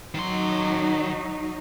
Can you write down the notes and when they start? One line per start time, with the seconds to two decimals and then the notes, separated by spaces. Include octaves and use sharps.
0.14 D#3 F#3 D#4 C6